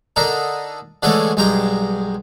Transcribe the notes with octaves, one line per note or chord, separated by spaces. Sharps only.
D3 D4 D#4 A#4
D3 E3 G#3 A3 C#4 D5
B1 G2 G#3 G5 A#5